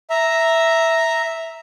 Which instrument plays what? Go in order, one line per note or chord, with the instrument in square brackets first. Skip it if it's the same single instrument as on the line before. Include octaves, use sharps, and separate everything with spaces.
[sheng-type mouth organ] E5 A#5